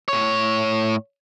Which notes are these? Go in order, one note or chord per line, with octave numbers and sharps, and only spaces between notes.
A2 C#5